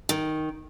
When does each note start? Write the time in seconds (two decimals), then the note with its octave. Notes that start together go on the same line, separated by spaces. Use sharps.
0.09 D#3